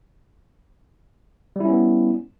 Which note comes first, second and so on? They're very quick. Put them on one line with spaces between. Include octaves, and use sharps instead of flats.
G3 E4 C#4 B3